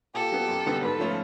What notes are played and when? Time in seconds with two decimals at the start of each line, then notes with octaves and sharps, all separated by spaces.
0.14 A#2 G4 A4
0.32 F#3 B3
0.49 F#2
0.66 D3 G3 B3
0.82 G#2 A4 B4
0.99 F3 A3 C#4 F4